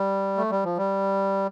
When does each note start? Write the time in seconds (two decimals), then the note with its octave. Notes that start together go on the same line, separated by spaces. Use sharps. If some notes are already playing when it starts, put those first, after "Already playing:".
Already playing: G3
0.37 A3
0.51 G3
0.64 F3
0.77 G3